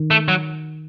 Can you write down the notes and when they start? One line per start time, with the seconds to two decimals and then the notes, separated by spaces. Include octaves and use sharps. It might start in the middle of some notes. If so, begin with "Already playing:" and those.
Already playing: D#3
0.11 A3
0.28 F#3